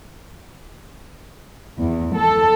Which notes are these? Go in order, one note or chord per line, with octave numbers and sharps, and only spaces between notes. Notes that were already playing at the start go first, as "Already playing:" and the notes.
E2
A4